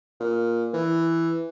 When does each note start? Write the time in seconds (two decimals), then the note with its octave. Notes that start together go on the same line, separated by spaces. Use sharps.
0.20 A#2
0.74 E3